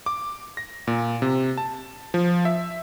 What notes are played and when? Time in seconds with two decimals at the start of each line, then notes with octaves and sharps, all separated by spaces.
0.06 D6
0.57 A#6
0.87 A#2
1.22 C3
1.58 A5
2.14 F3
2.45 E5